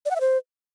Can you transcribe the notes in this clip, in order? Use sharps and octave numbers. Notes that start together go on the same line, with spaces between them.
D5
F#5
E5
C5